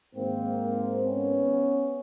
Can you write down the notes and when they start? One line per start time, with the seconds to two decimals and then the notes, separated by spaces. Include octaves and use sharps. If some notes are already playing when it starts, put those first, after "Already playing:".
0.15 G#2 D#3 A#3 C4
1.04 B3 C#4